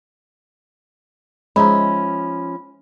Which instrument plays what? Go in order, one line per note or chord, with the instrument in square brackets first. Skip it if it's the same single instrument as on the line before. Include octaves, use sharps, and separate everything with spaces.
[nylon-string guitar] F3 C#4 E5 [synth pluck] G#3 D#4 [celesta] B5